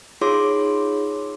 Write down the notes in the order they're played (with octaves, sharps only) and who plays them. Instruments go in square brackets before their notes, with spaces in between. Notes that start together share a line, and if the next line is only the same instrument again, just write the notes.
[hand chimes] D#4 F4 G#4 C#5 C6 D6